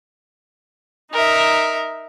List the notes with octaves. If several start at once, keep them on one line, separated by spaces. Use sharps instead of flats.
D#4 A#4 E5